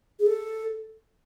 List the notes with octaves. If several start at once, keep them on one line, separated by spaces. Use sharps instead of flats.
G#4
A4